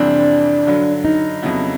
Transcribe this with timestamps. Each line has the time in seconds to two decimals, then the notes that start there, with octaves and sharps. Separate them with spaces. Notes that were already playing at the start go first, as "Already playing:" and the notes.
Already playing: F2 C3 E3 G3 C4 D4
0.67 G2 D3 F#3
1.05 D#4
1.42 F2 C#3 F#3 B3 E4